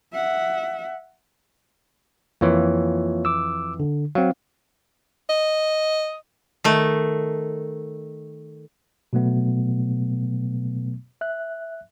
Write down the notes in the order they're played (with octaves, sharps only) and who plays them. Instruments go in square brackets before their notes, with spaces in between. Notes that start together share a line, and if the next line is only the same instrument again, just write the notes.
[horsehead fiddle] E5 F#5
[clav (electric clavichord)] F2 E3 [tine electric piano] A#3 F4 C#5
[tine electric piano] D6 E6
D3
[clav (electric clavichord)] F#3 [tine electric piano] C4 F5
[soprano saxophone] D#5
[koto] D#3 A3
[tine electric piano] B2 F#3 A3 B3
E5 F#6